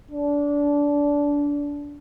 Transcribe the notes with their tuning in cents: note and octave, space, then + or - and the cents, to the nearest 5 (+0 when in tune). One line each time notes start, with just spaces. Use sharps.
D4 -20